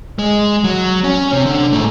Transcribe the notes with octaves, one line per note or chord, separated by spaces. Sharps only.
G#3
F#3
C#4
C3
D3
G#2 A3